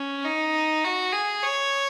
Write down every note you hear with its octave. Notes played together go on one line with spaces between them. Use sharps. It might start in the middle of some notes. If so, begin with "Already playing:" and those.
Already playing: C#4
D#4
F#4
G#4
C#5